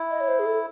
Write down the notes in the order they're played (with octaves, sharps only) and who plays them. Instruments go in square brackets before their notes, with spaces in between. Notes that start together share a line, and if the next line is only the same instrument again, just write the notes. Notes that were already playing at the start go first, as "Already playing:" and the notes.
Already playing: [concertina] E4
[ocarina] D#5
C#5
C5
G#4
A4